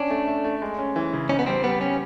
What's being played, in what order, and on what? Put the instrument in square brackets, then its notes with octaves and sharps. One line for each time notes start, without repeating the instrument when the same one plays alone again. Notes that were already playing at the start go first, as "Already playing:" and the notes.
Already playing: [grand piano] C#4 [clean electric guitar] D4
[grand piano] A3
A3
A3
G#3
C#4
E3
C#3
[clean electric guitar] C#4 [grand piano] D#4
[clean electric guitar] B3
[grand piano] G3 [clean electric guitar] C4
[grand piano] G3 [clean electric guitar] B3
[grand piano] G3 [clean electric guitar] C#4